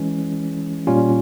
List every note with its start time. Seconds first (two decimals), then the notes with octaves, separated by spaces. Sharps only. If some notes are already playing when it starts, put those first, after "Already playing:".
Already playing: E3 G#3 C#4
0.87 A#2 G3 C#4 F4